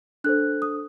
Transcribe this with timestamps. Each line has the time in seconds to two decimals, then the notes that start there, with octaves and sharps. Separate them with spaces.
0.24 D4 A4 C5 F#6
0.62 D#6